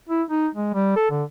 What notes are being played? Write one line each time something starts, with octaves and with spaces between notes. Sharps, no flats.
E4
D#4
G#3
G3
A4
D3